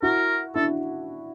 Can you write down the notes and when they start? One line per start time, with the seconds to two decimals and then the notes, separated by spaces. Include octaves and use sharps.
0.02 E4 F#4 A#4
0.55 D4 E4 A4